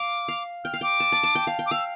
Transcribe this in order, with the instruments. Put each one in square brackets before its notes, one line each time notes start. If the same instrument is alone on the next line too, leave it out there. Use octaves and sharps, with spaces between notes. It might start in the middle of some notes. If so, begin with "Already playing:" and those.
Already playing: [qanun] F5 [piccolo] D6
[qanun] F5
[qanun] G5 [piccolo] F6
[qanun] F5
[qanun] G5 [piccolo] D6
[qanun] A5
A5
A5
G5
F5
G5
[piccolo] D6
[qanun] F5 [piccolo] E6